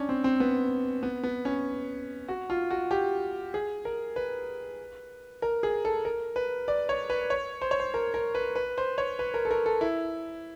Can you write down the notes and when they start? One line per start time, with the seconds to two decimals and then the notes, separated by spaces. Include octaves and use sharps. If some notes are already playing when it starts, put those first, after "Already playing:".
Already playing: C#4 D4
0.09 C4
0.24 C4
0.40 B3
1.03 B3
1.24 B3
1.45 C#4
2.28 F#4
2.50 F4
2.70 F#4
2.91 G4
3.54 G#4
3.85 A#4
4.16 B4
5.42 A#4
5.63 G#4
5.85 A4
6.05 A#4
6.36 B4
6.68 D5
6.89 C#5
7.10 B4
7.30 C#5
7.62 C5
7.71 C#5
7.80 C5
7.94 A#4
8.14 A#4
8.35 B4
8.55 B4
8.78 C5
8.98 C#5
9.19 B4
9.34 A#4
9.45 A4
9.51 A#4
9.66 A4
9.81 E4